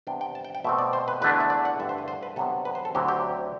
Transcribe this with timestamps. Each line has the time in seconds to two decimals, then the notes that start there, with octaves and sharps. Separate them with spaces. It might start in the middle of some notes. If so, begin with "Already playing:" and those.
0.07 C3 G3 B3 D4 G5
0.21 G5
0.35 A5
0.45 G5
0.55 G5
0.64 B2 A3 C4 E5
0.79 D5
0.93 C5
1.08 B4
1.21 E2 D3 A3 D4 B4
1.40 E5
1.50 D5
1.65 F#5
1.79 G2 D3 A3 E5
1.89 C5
1.98 B4
2.08 C5
2.23 B4
2.36 C3 F#3 B3 D4 A4
2.65 B4
2.75 C5
2.85 A4
2.95 D2 D3 F#3 C4 G4
3.08 G4